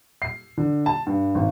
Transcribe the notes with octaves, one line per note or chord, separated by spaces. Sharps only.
C7
D3
A5
G2
G#1